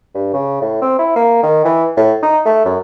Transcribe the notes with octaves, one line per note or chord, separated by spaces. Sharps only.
G2
C#3
A2
C4
E4
A#3
D#3
E3
A2
D#4
A3
F#2